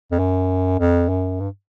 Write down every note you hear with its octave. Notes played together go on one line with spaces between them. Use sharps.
F2
F#2
F2
F#2
G2